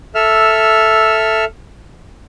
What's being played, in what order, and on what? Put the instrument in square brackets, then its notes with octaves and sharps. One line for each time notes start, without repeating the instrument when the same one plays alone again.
[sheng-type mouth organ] A4 E5 E6 F6